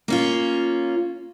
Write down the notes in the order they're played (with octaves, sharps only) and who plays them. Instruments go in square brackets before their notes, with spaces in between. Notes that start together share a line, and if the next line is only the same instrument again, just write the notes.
[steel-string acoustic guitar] A#3 C#4 F4